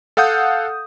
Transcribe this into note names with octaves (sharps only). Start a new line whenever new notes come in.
A4 F5 F#5 D#6 G6